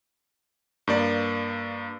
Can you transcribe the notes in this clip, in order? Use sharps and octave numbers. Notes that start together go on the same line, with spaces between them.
G2 A#3 D5